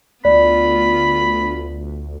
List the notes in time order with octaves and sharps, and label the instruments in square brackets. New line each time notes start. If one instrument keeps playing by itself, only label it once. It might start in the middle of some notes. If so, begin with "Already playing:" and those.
[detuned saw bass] D2 [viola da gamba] B3 F4 [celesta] D5 [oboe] B5